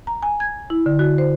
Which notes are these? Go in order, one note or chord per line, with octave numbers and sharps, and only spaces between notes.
A#5
G#5
G#6
E4
D3
F#4
C5